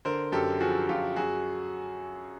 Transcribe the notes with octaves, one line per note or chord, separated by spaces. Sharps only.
D3 A#4 C5
F#2 G4 A4
F3 F#4 G#4
F#2 F4 G4
F#2 F#4 G#4